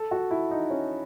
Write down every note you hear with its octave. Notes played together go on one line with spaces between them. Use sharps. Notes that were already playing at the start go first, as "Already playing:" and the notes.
Already playing: A4
F#4
E4
D#4
C#4